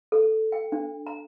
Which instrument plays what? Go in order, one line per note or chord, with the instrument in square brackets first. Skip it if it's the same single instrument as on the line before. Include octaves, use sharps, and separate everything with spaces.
[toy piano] A4
G5
D4
A#5